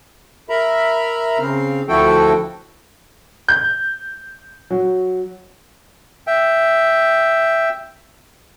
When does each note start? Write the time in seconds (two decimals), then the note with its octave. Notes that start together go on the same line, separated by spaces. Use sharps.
0.49 A#4 E5 A#5 B5
1.39 C#3 C4 F5
1.88 D2 F3 E4 F#4 A4 G5
3.48 G6
4.71 F#3
6.27 E5 G5